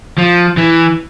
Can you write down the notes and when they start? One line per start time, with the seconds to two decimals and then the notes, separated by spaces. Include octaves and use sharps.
0.18 F3
0.57 E3